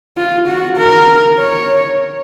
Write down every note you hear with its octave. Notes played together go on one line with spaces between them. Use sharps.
F4
F#4
A#4
C#5